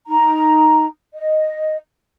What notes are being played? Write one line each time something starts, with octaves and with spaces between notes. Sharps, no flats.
D#4 A#5
D#5